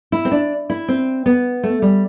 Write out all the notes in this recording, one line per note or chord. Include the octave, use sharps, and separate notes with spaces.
E4
C4
D4
E4
C4
B3
A3
G3